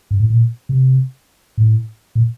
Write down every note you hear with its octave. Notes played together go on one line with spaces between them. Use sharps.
G2
A2
A#2
C3
A2
A#2